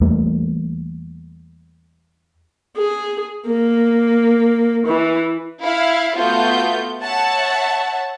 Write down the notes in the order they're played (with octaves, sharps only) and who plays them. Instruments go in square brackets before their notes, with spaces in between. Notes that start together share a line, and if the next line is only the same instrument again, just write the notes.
[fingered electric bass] E2 G3 A3 A#3
[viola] G#4
A#3
E3
[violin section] E4 F5
A3 B3 F4 F#4 G6
C#5 E5 F#5 A5